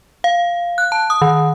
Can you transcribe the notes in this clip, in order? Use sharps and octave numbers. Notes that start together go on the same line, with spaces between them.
F5
F#6
A5
D#6
D#3